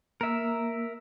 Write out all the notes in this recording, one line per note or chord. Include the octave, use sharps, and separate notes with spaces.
A#3 A#4 E5